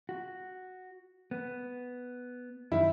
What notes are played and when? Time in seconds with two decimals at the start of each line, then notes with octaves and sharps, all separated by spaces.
0.09 F#4
1.31 B3
2.72 F#2 D#3 E4